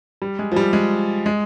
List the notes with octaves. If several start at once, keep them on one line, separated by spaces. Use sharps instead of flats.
G3
G#3
F3
G3
G#3
G#3